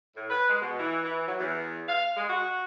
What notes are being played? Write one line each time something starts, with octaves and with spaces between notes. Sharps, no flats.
A2
B4
G#3
B2
E3
E3
F#3
E2
F5
G#3
F#4